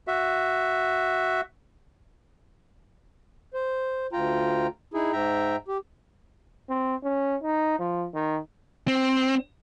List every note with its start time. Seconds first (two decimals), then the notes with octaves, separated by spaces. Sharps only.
0.07 F#4 E5
3.54 C5
4.13 D2 F4 G5 A#5
4.94 D#4 E4 G#4
5.12 G#2 E5 G5 A#5
5.68 G4
6.69 C4
7.03 C#4
7.42 D#4
7.79 F3
8.14 D#3
8.88 C4